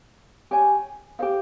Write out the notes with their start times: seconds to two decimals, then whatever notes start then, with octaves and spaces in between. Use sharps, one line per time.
0.51 G4 C#5 G#5
1.19 G4 C5 F5